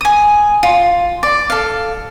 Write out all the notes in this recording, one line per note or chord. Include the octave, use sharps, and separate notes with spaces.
G#5 D#6
F4
D5
A4 F5